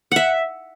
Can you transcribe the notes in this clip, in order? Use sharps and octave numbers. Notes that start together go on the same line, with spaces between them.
E5 F#5